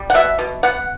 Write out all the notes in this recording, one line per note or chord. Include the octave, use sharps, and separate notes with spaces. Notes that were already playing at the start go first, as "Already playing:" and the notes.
Already playing: G3
F#5
B2 E5
B2
B3 F#5